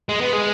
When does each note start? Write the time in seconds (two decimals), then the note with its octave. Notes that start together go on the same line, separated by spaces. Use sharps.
0.09 G#3
0.21 B3
0.33 G#3